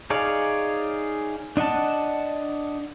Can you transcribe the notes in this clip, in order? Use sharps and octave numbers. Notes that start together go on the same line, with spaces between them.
D#4 G#4 C#5 D5 F5
D4 D#5 F#5 A5